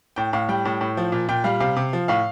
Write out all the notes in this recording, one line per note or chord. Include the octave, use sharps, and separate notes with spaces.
A2 G5
A2 F5
G3 G5
A2
A2
F3
A#2
A#2 G5
G3 F5
C3 F5
C3
F3
A2 F5